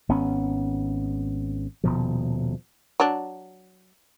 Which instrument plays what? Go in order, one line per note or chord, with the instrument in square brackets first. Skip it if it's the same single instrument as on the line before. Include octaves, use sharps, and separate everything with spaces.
[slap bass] G#1 B3 C#4
D#1 B2 F3
[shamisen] F#3 D4